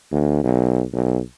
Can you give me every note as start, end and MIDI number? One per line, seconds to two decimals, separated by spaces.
0.12 0.41 38
0.44 0.84 35
0.94 1.20 35